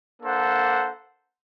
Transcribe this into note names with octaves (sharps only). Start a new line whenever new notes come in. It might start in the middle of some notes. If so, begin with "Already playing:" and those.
A#3 D4 A4 C5 F#5